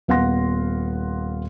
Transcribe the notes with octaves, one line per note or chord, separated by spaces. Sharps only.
D#1 B3 F5 F#5 C6 A#6